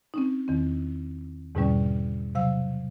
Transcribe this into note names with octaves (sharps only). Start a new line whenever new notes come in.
C4 C#4 D#4
E2 D#3 C4
E2 G#2 B2 D3 G3 C#4
C3 F#3 F5 E6